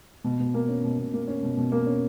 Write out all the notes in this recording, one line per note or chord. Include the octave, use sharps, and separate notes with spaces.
B2
B2
A#3
C#4
B2
B2
A#3
C#4
B2
B2
A#3
C#4